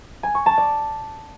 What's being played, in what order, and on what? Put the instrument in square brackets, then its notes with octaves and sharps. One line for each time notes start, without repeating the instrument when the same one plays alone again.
[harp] G#5
C#6
A5
D5